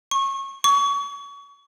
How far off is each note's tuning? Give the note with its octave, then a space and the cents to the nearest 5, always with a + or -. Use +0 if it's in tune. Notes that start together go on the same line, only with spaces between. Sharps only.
C#6 -25
C#6 +30